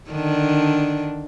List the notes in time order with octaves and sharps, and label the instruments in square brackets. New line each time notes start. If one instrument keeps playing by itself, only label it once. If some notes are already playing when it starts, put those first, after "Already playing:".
[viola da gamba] D3 D#3 D4